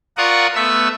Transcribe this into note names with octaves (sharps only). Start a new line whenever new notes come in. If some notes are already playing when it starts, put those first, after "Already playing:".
F4 A#4 D5 F#5 C#6 D#6
A3 B3 E5 E6